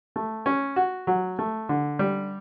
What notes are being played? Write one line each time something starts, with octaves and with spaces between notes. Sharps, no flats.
A3
C#4
F#4
F#3
A3
D3
G3